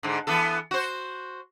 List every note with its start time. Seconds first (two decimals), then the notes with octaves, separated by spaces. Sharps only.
0.03 G#2 D3
0.27 E3 B3 A4
0.71 F#4 C5